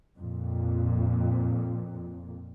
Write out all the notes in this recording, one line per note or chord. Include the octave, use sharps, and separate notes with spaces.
F2 A#2